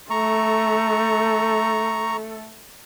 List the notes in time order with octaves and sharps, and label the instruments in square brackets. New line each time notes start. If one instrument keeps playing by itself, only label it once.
[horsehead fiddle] A3 A4 [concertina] A#5 C#6